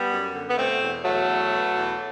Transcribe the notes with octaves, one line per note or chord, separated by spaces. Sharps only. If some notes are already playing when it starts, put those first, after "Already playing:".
Already playing: G3 B3
F#2
D3
B3
B2 A3 C4
E2
E2 F#3 A3
B2
B2
E2